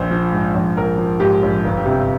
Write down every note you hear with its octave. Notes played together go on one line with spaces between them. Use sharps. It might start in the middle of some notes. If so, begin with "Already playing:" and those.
Already playing: A#1 C5
F3
G#2
A#1
A#1 A#4
F3
G#2 G4
A#1
G1
C3